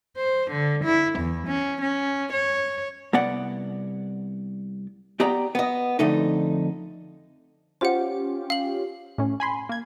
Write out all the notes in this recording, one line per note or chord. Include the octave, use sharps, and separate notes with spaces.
C5
D3
E4
E2
C#4
C#4
C#5
C2 B3 D5 F#5
B3 G4 D5 G5 A#5
B3 D#5
F2 D3 A3 D#4
C#4 F4 G4 C5 F#5
F5 F#7
A2 C#4
G#5 B5 C6
A#3 G#6